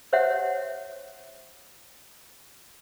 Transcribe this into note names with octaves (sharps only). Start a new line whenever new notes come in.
G4 C5 C#5 E5 F#5